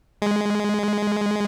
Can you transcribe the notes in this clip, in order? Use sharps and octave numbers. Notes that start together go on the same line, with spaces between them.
G#3